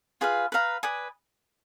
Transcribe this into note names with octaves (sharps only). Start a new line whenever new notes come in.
F4 G#4 B4 F5
B4 F5 A#5
B4 D5 G#5 D#6